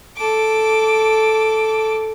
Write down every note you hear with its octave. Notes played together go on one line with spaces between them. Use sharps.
A4 D6